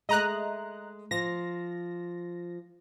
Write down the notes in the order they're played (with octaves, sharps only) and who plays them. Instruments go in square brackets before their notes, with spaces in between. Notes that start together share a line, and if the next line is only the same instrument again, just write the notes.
[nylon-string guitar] G#3 A3 [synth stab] D#5 A#5 F#6
[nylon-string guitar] F3 [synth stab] A#6